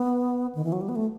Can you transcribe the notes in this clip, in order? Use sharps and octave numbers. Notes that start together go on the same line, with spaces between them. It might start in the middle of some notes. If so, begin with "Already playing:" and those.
Already playing: B3
D#3
E3
F#3
G3
B3
A3